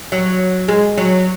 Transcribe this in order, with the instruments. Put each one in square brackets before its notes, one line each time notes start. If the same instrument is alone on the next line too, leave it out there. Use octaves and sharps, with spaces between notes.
[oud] F#3
G#3
F#3